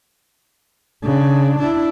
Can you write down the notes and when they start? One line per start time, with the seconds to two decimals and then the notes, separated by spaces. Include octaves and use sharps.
1.03 C#3 D4
1.60 D4 E4